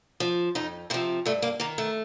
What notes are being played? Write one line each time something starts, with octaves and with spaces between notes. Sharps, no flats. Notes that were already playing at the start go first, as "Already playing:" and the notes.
F3
F2 D#4
C3 F3 C4
G2 A3
A#3
D#3 A#3
A3